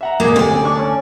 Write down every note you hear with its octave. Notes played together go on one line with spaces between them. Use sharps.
E5 F#5 A#5
E2 B2 A#3 G#4 D6
D2 C3 D5
F#2 G#5
D4 C#6
C#4